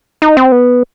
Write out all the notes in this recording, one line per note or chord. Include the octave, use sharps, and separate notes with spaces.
D#4
C4
B3